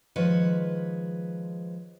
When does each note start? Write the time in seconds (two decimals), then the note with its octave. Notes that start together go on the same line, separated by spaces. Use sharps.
0.16 D#3 F3 G#3 B4 C#5